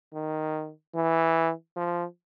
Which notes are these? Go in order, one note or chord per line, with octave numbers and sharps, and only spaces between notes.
D#3
E3
F3